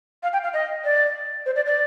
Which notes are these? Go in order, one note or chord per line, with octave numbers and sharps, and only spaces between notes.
F5
G5
F5
D#5
D5
C5
D5
D5